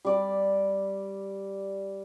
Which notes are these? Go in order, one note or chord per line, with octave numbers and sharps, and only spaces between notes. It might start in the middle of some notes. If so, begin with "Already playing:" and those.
G3 D5